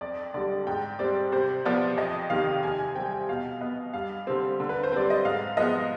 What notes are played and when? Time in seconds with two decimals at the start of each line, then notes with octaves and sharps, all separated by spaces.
0.01 F2 D5
0.34 D3 G3 D5
0.67 G#2 G5
0.99 G3 C4 D5
1.32 C3 C5
1.65 F3 B3 D5
1.97 F2 D#5
2.30 C3 D#3 F5
2.63 C3 G#5
2.79 G#5
2.95 G3 C4 G5
3.12 G5
3.28 B2 F5
3.61 B3 D#5
3.94 G2 F5
4.27 D3 G3 C4
4.60 D3
4.69 B4
4.83 C5
4.92 G3 C4 D5
5.10 D#5
5.25 G#2 F5
5.57 F3 G#3 B3 D#5